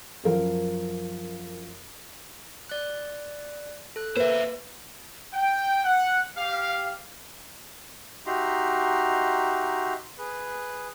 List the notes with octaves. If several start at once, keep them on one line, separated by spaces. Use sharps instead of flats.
F#2 F3 A#4 F5
D5 F#6
A4 F#6
A#3 B4 C5 E5
G5
F#5
G4 F5
D#4 F#4 G4 E5 A#5 C6
G#4 B4